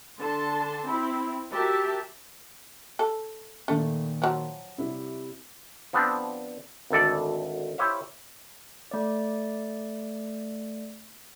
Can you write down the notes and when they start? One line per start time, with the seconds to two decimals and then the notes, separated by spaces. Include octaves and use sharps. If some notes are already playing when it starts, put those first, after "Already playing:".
0.20 D3 A5 C6
0.86 C4 E4
1.51 F#4 G4 A#4 E5 A5
2.99 A4
3.68 A#2 D#3 A3
4.22 F3 F#3
4.78 C3 G3 E4
5.93 F3 B3 C4 D4
6.90 G#1 D2 A4 D5
7.78 E4 G4 C5 C#5 E5 F5
8.91 A3 D5